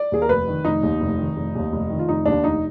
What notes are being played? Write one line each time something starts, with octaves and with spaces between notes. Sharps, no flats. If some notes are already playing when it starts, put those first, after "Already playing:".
Already playing: D5
D#2 G#4
A#4
F1 B4
D#3
F1 D#4
D#2
F1
D#3
F1
D#2
F1
D#3
F4
F1 D#4
D#2 D4
F1 D#4